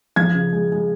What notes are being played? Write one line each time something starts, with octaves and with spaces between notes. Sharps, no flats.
F3 G#6
C#3
G#3
G#3